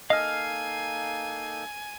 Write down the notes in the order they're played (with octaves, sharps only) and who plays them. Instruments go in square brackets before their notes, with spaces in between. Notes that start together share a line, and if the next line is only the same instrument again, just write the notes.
[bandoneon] A#3 D#4 A4 [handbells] D#5 [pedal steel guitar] F5 F6 [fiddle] G#5